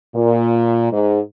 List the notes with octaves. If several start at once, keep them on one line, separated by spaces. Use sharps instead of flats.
A#2
G#2